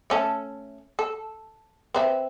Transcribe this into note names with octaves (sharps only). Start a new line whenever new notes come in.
A3 C#4 A4
A4
C4 B4 E5